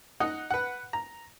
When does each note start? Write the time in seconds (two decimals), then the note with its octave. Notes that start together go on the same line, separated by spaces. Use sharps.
0.20 D#4 D#5 F#5
0.50 B4 F#5
0.93 A#5